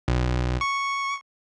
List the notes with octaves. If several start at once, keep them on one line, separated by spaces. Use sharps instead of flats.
B1
C#6